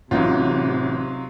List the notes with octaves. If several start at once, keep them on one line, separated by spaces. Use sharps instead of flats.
A1 C3 F#3 D#4 F4